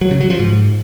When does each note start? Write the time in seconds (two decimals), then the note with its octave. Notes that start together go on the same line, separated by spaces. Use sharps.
0.01 F#3
0.11 C#3
0.20 F#3
0.30 F3
0.40 G#2